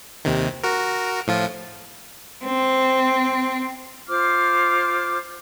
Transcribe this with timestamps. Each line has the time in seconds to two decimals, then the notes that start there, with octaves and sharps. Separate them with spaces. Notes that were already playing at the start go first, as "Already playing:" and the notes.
0.25 D#2 C3 D#3
0.63 F#4 A#4
1.27 A2 F3 F4
2.45 C4
4.09 F4 C5 D6 F6